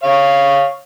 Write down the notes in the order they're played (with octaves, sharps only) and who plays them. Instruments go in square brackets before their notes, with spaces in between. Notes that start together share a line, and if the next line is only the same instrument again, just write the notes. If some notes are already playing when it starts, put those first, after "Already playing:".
[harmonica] C#5 F5